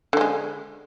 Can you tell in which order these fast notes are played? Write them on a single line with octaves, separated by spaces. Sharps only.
D3 G3 G#3